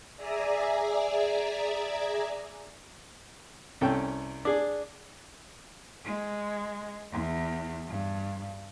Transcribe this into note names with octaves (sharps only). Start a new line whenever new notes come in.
G#4 D5 E5 G#5 A#5
C2 C#4 A4 G5
D4 G#4
G#3
E2
G2